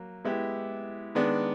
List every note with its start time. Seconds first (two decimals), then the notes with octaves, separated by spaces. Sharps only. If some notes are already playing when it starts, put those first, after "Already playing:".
Already playing: F#3 A#3
0.25 G#3 B3 E4 G4
1.15 D#3 G#3 B3 D4